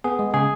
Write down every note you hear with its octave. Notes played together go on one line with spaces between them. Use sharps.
B3 G#4
G#3
C#3 G#4